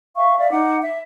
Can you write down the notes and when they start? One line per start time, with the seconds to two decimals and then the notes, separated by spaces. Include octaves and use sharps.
0.16 E5 F5 C#6
0.39 D5 E5 F5
0.51 D#4 F#5 D6
0.81 E5